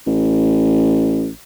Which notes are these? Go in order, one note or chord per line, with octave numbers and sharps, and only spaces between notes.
A1